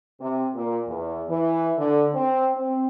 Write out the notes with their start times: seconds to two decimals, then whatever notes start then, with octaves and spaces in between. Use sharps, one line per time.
0.20 C3
0.54 A#2
0.87 E2
1.30 E3
1.78 D3
2.13 C4
2.55 C4